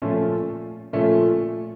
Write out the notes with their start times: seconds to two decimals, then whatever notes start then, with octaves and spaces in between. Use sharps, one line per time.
0.02 A#2 F3 A3 C#4 F4
0.93 A#2 F3 A3 C#4 F4